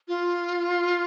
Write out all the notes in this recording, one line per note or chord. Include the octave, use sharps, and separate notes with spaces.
F4